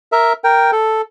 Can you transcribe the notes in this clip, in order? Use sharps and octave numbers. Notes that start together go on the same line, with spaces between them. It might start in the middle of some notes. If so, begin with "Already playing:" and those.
A#4 E5
A#4 G5
A4